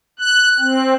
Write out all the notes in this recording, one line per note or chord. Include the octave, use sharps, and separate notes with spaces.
F#6
C4